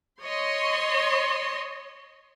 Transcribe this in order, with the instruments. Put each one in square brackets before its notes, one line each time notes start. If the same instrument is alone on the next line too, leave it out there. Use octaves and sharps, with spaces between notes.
[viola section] C#5 D#5 C6